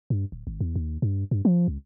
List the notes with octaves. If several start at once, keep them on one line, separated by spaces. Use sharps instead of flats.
G2
D1
G#1
E2
D#2
G2
G2
F3
C#2